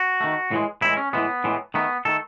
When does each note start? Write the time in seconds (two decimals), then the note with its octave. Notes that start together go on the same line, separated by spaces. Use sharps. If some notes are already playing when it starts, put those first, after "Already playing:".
Already playing: F#4
0.21 D#3 A3
0.51 A2 E3 G#3
0.82 A2 E3 G#3 E4
0.97 C#4
1.13 A2 E3 G#3 B3
1.44 A2 E3 G#3
1.74 D#3 A3 B3
2.05 D#3 A3 A4